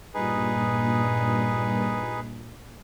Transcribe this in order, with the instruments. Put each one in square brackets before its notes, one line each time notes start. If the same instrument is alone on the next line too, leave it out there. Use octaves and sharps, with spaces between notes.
[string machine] G2 A#2 [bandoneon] D#4 G#4 B4